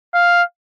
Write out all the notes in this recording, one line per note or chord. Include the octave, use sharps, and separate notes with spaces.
F5